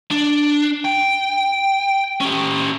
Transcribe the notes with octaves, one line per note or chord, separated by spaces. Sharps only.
D4
G5
C#4 G4